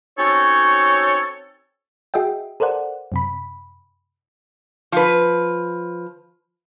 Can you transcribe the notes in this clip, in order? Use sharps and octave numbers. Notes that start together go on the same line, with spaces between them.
C4 C#4 D#4 F#4 A4 C#5
F#4 G#4 D#5 E5 G5
A4 A#4 C5 D5 F#5
F#2 C3 B5
F3 B4